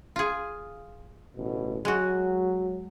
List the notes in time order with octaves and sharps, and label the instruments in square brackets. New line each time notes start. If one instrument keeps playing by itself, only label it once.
[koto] F4 G#4
[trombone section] A1 D2 B2
[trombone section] F#3 [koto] G#3 F#4